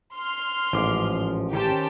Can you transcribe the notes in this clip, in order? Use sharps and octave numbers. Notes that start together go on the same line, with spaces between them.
C6 F6
A1 G#2 F3 F5 D6
D#3 C#4 G4 C5 A5